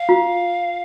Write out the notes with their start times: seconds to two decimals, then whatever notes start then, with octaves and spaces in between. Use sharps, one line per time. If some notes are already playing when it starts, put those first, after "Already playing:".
Already playing: F5
0.09 F4